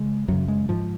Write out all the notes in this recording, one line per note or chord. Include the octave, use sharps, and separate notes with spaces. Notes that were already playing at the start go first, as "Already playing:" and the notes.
Already playing: C#3 G#3
F#2 C#3 F#3
G#3
G#2 F3